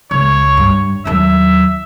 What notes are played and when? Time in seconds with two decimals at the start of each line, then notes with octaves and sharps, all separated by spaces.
0.11 C#2 C#5
0.57 G2
1.05 D#2 F#3 E5